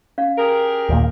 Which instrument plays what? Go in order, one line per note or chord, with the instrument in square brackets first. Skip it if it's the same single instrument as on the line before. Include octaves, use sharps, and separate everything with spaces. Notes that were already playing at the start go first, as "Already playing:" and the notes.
[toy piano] C#4 D5 F5
[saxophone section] G4 G#4 A#4
[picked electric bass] D#2 A#2 A#3